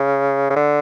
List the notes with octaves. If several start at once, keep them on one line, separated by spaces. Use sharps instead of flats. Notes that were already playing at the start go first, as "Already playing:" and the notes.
Already playing: C#3
C#3
D3